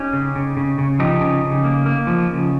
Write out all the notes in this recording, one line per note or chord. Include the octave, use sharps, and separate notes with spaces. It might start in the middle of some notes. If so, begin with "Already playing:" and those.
Already playing: C#4 D#4 G4
C#3
C#3
C#3
C#3
F3 D#4 G4
C#3
C#3
A#3
A#3
F3
C#3